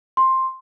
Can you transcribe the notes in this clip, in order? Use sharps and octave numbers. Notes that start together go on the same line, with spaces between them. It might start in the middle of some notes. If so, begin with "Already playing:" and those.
C6